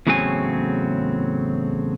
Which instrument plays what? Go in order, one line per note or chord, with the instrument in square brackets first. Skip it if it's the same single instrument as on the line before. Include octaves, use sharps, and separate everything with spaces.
[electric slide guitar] E2 A2 C#3 F#3 C4 G#5